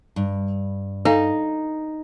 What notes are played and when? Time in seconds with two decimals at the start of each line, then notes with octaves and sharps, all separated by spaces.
0.16 G2
1.05 D#4 A4 F5 G#5